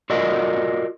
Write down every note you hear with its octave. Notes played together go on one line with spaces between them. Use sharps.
F4 F#4 A4 A#4 D5 D#5